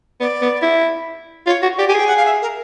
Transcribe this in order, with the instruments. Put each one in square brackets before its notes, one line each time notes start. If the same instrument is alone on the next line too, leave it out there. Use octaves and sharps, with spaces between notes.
[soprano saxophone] B3 [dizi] D5
[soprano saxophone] B3
E4
[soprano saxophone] F4 [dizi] C#5
[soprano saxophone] F#4
[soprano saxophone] G4 [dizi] D5
[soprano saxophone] G4 [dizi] G#5
[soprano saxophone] G#4 [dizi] G5
[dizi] F#5
F5
E5
A#4